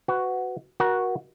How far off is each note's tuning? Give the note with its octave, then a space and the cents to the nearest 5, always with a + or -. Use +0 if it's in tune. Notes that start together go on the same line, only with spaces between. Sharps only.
F#4 +5 B4 +30
F#4 +0 A#4 +30